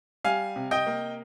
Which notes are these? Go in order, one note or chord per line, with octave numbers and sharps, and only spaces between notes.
G3 F5 G#5
C3
D#5 G5
A#3